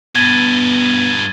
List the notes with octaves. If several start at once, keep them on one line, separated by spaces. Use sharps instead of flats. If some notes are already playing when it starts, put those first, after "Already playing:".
G2 B2 B3 G#6 A6 D#7